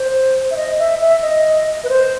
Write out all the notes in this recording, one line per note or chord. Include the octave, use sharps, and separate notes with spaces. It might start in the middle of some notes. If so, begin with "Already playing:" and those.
Already playing: C5
E5
D#5
E5
E5
D#5
B4
C5